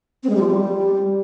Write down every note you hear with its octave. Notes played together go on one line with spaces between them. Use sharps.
C4
G#3
G3
F3
G3